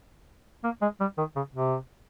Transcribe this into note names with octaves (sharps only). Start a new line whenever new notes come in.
A#3
G#3
G3
D#3
C#3
C3